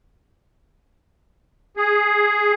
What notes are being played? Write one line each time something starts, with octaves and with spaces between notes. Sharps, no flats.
G#4